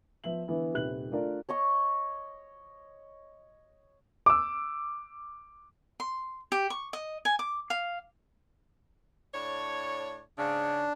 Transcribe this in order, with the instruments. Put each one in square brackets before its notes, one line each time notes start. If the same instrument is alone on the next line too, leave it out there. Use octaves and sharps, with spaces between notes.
[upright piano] F3 B3 E5 F#7
D3 E3 B3 E4
D#1 C3 D#3 B4 F#6 F#7
A3 D4 F4 A#4 D5
[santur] C#5 D#5 C#6
[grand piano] D6 E6
[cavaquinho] C6
G4
C#6
D#5
G#5
D6
F5
[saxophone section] A2 D4 C#5
[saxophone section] G#2 C#3 [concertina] D4